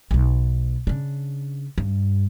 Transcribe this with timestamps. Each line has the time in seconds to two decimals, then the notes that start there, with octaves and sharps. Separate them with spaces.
0.11 B1 B3
0.87 C#3 D4
1.78 G2